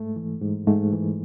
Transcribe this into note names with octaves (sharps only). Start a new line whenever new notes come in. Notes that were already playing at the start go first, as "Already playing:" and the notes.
Already playing: G#2 A3
E3
G#2
G#2 A3
E3